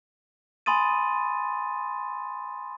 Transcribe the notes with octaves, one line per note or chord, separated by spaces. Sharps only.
G#5 B5 C6 D#6 A6 D#7